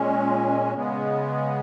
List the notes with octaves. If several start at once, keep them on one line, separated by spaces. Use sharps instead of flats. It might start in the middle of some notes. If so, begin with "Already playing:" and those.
Already playing: A#2 G#3 C#4
C#3 G#3 B3